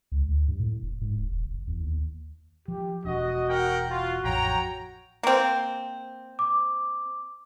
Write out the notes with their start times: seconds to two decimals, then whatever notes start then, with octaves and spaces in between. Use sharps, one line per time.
0.12 C#2
0.28 D2
0.48 G2
0.60 A2
0.83 F1
1.01 G#2
1.16 D1
1.32 E1
1.46 F#1
1.67 E2
1.81 D#2
2.68 F3 G4
3.04 E1 D4 F#4 D#5
3.48 A#4 F#5 G5
3.89 F4 F#4
4.24 A1 F2 C#5 G5 A#5
5.23 A#3 C4
6.39 D6